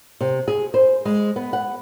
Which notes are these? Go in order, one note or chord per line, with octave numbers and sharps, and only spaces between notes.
C3
G#4
C5
G#3
B3
F#5